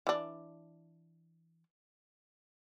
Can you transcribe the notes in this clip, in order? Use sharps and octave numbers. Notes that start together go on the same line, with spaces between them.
E3 D4